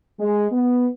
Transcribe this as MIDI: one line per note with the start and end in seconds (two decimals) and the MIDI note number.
0.20 0.47 56
0.52 0.88 59